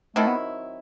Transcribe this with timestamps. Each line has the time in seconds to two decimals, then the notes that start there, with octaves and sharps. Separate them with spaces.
0.16 D#3 F#3 A3 C4 E4
0.27 B3